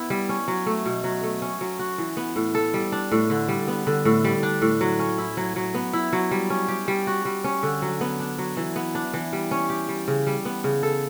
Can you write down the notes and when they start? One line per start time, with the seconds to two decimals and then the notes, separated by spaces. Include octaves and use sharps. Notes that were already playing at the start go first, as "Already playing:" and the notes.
Already playing: B3 E4
0.10 G3
0.29 C#4
0.48 F#3
0.66 A3
0.86 B2
1.04 F#3
1.23 A3
1.42 C#4
1.61 F#3
1.79 F#4
1.98 E3
2.17 B3
2.36 A2
2.55 A4
2.74 G3
2.92 D4
3.12 A2
3.30 D3
3.48 G3
3.68 B3
3.87 D3
4.05 A2
4.24 G3
4.43 D4
4.62 A2
4.81 F#3
4.99 C#4
5.18 E4
5.37 F#3
5.56 F#3
5.74 B3
5.93 E4
6.13 F#3
6.31 G3
6.50 C#4
6.68 G4
6.88 G3
7.07 F#4
7.25 G3
7.44 C#4
7.63 D3
7.82 F#3
8.01 B3
8.20 D4
8.39 F#3
8.57 E3
8.76 B3
8.95 D4
9.14 E3
9.33 G3
9.51 C#4
9.70 G4
9.89 G3
10.08 C#3
10.27 G3
10.45 B3
10.64 C#3
10.83 A4